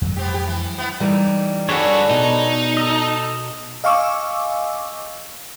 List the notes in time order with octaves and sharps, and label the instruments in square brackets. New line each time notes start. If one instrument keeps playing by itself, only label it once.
[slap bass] F2 F#3 G#3
[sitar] B3 C4 G4
G4
E3
B3 E4
[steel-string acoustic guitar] E3 G3 D#4 [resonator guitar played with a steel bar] A3 A#4
[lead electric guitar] G2 F#4 [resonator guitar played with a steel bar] D4 G#4 [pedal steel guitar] A4 B4 C#5
[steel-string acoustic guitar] B2 [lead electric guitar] D#4
[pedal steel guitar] A4 D#5
[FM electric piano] D#5 F5 G#5 C#6 D6 E6